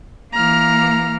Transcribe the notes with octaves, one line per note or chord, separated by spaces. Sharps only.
E3 A#3 A#5 F6